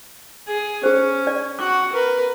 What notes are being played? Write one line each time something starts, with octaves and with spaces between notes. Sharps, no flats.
G#4
C#4 G#4 C5
D5
F#4 F#5 D6
A#4 B4